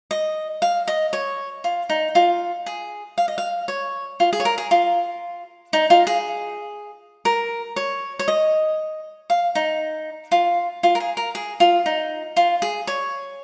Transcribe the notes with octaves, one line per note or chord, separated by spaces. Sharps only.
D#5
F5
D#5
C#5
F4
D#4
F4
G#4
F5
D#5
F5
C#5
F4
G#4
C#5
A#4
G#4
F4
D#4
F4
G#4
A#4
C#5
C#5
D#5
F5
D#4
F4
F4
A#4
G#4
A#4
G#4
F4
D#4
F4
G#4
C#5